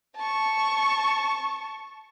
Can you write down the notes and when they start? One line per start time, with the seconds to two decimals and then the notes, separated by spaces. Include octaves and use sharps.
0.16 A5 C#6